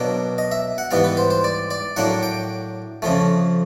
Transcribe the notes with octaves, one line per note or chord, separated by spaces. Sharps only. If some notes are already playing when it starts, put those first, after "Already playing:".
Already playing: B2 F#3 A#3 D4
D#5
E5
F#5
G#2 E3 G3 B3 F5
B4
C5
C5
D5
D5
A2 F#3 A#3 D4 F#5
G5
F2 C#3 F3 A3